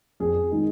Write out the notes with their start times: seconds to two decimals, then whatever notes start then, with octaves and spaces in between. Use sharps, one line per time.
0.20 F2 G#4
0.51 D#3 G#3 D#4